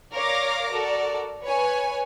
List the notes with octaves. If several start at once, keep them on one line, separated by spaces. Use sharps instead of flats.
A#4 C#5 D5 F5 D6 A#6
F#4 A4 A#4 D5
B4 C#5 G#5